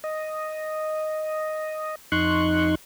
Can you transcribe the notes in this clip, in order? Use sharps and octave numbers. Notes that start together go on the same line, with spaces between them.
D#5
F2 D#4 C6 C#6 F#6